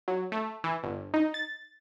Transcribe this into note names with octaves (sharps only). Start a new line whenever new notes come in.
F#3
A3
E3
G1
D#4
A6